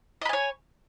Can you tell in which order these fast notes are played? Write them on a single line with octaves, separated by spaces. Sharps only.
D#5 B5 G#5 C#5